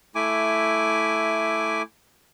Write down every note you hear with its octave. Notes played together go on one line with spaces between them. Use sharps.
A3 E4 G#5 D6